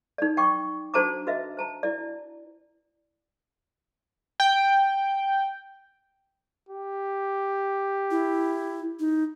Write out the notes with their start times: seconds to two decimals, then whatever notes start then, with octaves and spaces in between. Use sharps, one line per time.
0.18 D#4 D5
0.37 G5 C#6 D6
0.94 D4 F#4 C5 A5 A#5 D6
1.27 F#4 B4 D#5 E5
1.57 C5 A5 A#5
1.83 E4 D5
4.40 G5
6.69 G4
8.11 E4
8.99 D#4